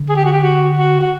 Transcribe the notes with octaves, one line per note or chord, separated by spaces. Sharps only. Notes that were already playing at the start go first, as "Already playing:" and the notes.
Already playing: D3
G#4
G4
F#4
G4
F#4
F#4
F#4